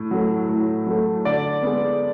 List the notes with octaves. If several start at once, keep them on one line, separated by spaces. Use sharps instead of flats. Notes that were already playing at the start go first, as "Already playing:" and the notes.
Already playing: A2
F#3 A3
A2
F#3 A3
D3 D5
G#3 B3